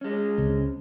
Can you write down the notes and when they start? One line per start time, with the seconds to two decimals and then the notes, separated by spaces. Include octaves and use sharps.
0.01 G#3 C#4
0.38 C#2 C#3 C4